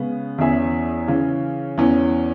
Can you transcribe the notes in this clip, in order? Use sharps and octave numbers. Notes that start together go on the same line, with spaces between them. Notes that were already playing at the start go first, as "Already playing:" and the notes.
Already playing: C#3 G#3 B3
E2 E3 C#4 G#4 E5
C#3 E3 C#4
E2 E3 C#4